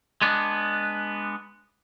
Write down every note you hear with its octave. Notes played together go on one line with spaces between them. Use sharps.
G#3 B3 D4